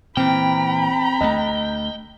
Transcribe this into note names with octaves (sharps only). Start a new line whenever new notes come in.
A#2 E3 C4 G5 A#5 B5
D2 A3 D#5